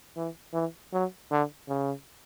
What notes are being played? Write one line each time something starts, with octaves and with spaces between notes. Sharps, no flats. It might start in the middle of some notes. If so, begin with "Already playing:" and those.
E3
E3
F#3
D3
C#3